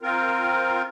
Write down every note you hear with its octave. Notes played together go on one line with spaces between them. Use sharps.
C4 F4 A#4